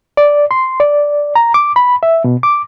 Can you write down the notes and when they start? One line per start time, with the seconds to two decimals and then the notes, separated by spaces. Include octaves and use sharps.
0.17 D5
0.51 C6
0.80 D5
1.35 A#5
1.54 D6
1.76 B5
2.03 E5
2.24 B2
2.43 D6